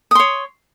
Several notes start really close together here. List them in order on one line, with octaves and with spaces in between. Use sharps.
D#6 C6 C#5